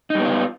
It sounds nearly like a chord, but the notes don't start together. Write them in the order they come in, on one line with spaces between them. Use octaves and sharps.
D#4 G3 B3 F4